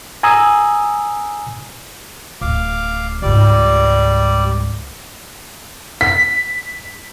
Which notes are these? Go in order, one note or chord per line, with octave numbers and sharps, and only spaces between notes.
G#5 A#5 D#6 E6
D1 F5 D6
C#2 G#2 G3 D5
B6